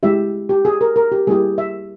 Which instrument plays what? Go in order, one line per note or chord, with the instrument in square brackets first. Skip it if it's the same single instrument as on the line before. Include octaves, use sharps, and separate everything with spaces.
[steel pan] G#3 E4 G4 E5
G4
G#4
A#4
A#4
G4
G3 A#3 E4 G4 G#4
E5